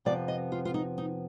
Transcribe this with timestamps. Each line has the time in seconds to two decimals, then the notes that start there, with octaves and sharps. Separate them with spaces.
0.05 F2 C3 F3 B3 D5
0.28 D#5
0.52 F4
0.65 F4
0.74 D#4
0.98 D#4